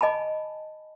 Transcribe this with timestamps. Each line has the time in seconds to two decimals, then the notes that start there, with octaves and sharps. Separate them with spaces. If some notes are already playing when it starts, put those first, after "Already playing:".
0.01 D#5 G#5 A5 B5